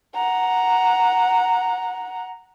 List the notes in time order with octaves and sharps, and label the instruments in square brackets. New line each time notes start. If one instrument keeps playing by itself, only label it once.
[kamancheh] F#5 A#5